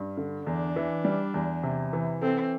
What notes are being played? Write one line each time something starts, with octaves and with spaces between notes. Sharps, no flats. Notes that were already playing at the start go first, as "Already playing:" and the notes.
Already playing: G2
D3
E2 D4
E3
G3
E2
C3
E3
C4 A4